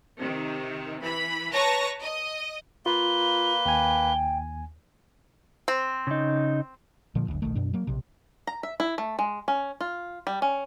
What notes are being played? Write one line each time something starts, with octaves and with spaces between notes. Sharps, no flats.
C3 D#3
E3 B5
B4 C#5 A5 A#5 C#6 A#6
D#5
A#3 F4 B4 G7
D#2 G5 G#5
C4
C#3 D#4
A#2 D3 F3 A#3
F#1 D2
D#1 A#1 D#3 A3
F#2 B2 D4
F#3 A#3
A#1 C3
A#5
E5
E4
A3
G#3
C#4
F4
G3
C#4